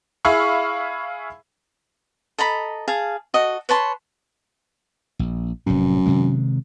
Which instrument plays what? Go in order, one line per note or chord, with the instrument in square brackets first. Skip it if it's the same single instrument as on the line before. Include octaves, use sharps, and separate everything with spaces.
[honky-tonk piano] E4 G#4 E5 F5 B5 C#6
[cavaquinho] A4 D#5 A#5 B5
G#4 F5 A5
F#4 A4 D#5
B4 C#5 A5 C6
[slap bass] A#1
[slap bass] F1 A2 [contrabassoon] F#2
[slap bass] C3 D#3 G#3